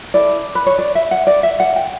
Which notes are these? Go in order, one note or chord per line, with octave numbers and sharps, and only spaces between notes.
E4 A4 D5
B4
C#5
D5
E5
F#5
D5
E5
F#5
G5